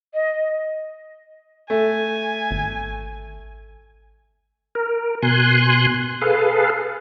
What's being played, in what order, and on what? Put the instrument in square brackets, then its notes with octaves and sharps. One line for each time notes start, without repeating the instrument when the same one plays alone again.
[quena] D#5
[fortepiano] A3 [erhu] G#5
[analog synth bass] G#1
[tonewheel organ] A#4
B2 G#5 C6 F#6
G#4 A4 B4 F5